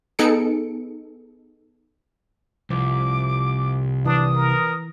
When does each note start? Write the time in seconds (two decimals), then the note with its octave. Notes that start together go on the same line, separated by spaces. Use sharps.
0.19 B3 D#4 G#4 A4 C#7 D7
2.70 C2 F3 D6
4.06 E3 D4 D#6
4.36 A#4